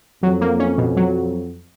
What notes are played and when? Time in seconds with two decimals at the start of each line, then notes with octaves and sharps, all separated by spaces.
0.23 F2 F#3
0.41 A#3
0.60 C#4
0.78 B2
0.97 F#3